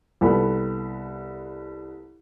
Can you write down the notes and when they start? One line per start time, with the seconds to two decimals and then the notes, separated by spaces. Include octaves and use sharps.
0.21 C2 B3 A4 B5